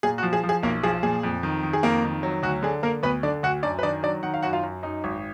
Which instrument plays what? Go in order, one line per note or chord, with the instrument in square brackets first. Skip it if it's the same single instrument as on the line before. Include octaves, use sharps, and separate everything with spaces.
[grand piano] A#2 G#4
F#4
F3
G#4
F3
G#4
B1 A#3 A#4
F3 G#4
A#2 G#4
F2
D#3
D#3
G#4
F2 A#3 A#4
D#3
F#3
D2 F#4
D3 G#4
D3 A#3 A#4
D2 B3 B4
D3 D4 D5
D2 F#4 F#5
F#2 D4 D5
B4
D#3 D4 D5
F#3 D4 D5
D#3 F#5
F5
F#2 F#4 F#5
F4 F5
F#2
F#2 D#4 D#5
G#1